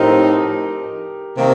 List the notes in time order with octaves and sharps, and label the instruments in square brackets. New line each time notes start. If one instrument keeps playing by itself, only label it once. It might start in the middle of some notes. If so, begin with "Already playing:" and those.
Already playing: [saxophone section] A2 F3 C4 D#4 [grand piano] G4 A#4
[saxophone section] C3 D#3 A#3